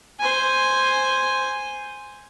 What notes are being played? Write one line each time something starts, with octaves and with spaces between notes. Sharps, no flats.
C5 G#5